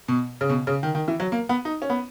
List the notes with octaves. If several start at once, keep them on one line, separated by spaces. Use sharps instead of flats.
B2
C#3
B2
C#3
D#3
D#3
E3
F#3
A#3
B3
D#4
C#4
B3